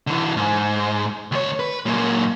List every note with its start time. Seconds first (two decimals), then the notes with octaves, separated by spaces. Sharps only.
0.07 D3 E3
0.37 G#2
1.32 D2 C#5
1.60 B4
1.86 F#2 A#2